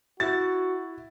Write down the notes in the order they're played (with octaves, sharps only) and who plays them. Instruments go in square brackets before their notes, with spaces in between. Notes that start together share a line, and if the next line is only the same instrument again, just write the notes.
[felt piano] E4 A6 [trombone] F#4